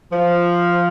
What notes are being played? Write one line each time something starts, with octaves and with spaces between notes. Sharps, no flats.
F3